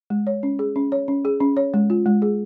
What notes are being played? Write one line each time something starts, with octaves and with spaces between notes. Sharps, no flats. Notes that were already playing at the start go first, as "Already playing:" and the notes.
G#3
C#5
C#4
G#4
C#4
C#5
C#4
G#4
C#4
C#5
G#3
F4
G#3
G#4